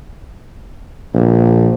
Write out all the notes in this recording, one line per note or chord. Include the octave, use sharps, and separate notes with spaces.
A#1